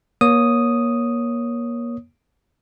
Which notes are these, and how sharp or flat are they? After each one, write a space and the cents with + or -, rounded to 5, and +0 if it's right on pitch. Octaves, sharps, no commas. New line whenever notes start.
A#3 +30 C#5 +0 D#6 +0